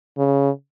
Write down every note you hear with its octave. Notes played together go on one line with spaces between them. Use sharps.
C#3